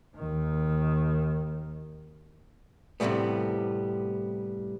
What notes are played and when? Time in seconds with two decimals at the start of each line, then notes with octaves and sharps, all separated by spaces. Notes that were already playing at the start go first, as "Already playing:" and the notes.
0.16 D#2 D#3
3.00 A2 C3 E3 G3 A3 B3